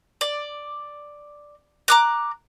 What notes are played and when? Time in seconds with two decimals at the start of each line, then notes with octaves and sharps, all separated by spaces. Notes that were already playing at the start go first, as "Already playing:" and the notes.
0.21 D5
1.88 A#5 D6 F#6